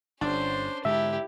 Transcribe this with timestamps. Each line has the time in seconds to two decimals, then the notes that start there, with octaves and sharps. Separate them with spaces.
0.21 G1 C#4 D4 C5
0.85 G#2 D3 G#3 E4 G4 E5